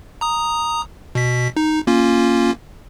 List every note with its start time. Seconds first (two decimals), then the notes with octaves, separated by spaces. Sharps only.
0.21 A#5 D#6
1.15 B2 B6
1.57 D#4
1.87 A#3 C#4 F4